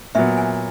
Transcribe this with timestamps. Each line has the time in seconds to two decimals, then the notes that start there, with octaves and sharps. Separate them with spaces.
0.15 A#2 F#3 B3 E5
0.37 G#5